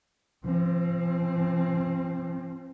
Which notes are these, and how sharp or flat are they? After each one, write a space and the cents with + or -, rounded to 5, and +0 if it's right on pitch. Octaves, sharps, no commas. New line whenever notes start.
F3 -35 C4 +20